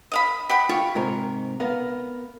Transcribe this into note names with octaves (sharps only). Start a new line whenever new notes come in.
D#5 F5 B5
G4 F#5 B5
F4 G4 C#6
G#2 C3 A#4
B3 A#4 F5